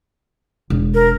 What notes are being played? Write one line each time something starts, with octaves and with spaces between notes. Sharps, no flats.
E1
A#4